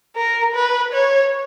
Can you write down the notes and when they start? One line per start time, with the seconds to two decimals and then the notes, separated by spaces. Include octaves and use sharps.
0.16 A#4
0.54 B4
0.92 C#5